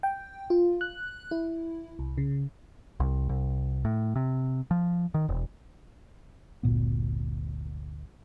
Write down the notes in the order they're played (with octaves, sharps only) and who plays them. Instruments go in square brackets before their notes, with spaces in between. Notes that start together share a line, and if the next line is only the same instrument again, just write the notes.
[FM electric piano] G5
F4
F#6
E4
C2
C#3
[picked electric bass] C2
C2
A2
C3
F3
D#3
E1
[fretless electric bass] G1 D2 A#2 B3